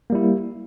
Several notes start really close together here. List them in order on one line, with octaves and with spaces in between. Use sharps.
A#3 G3 E4